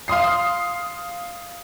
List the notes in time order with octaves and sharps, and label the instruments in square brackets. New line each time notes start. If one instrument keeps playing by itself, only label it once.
[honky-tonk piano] F5 C6 D#6 C7